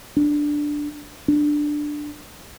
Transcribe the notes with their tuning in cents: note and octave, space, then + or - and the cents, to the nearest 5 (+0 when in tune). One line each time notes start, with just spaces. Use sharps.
D4 +5
D4 +10